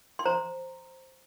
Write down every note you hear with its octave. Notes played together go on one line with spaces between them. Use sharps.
C6
C5 A#5